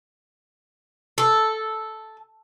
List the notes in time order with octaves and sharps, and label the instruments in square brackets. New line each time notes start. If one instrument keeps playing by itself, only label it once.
[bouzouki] A4